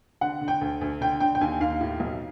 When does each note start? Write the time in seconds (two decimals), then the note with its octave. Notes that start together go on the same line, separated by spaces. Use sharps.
0.21 D3 F#5
0.41 D3
0.48 G5
0.61 D2
0.81 D2
1.01 D3 G5
1.20 D3 G5
1.35 G5
1.41 D#2 G#5
1.61 D#2 F5
1.81 A2
2.00 B1